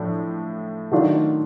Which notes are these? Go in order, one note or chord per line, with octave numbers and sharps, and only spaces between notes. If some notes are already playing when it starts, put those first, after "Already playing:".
Already playing: A2 F3 A3 D4
D#3 F#3 A3 D4 F4